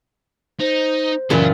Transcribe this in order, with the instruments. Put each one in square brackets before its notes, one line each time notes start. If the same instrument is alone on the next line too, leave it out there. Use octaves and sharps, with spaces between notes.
[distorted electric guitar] D#4 [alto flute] C5
[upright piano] F#1 [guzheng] A#2 E3 F4 [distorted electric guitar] F5 B5